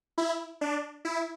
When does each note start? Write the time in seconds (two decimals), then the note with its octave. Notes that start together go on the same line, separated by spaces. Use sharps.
0.18 E4
0.61 D4
1.05 E4